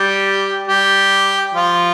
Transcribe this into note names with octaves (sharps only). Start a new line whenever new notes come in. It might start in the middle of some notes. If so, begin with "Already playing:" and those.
Already playing: G3 G4
G3 G4
F3 F4